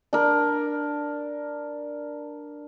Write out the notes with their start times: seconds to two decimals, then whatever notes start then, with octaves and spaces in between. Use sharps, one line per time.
0.13 D4 A#4